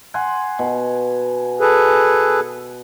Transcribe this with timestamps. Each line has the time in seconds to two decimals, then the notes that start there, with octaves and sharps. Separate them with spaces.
0.14 F#5 G#5 C6
0.59 B2
1.60 G#4 A4 B4